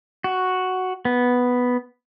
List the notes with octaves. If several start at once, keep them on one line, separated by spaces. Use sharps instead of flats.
F#4
B3